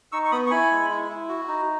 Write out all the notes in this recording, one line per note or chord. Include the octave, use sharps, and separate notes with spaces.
D#4 C#6 E6
C#6
B3 B5 D#6
C#6
E4 G#5 B5
G#3
E4
E4
F#4
D#4